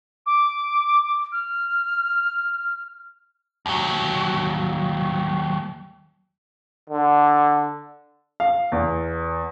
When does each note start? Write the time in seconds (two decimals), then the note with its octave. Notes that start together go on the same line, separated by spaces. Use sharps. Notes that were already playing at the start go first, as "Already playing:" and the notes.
0.26 D6
1.32 F6
3.66 D#2 F#3
6.89 D3
8.40 F5
8.72 E2